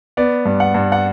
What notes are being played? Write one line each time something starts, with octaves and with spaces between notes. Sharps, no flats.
B3 D5
G2
F#5
G2
F#5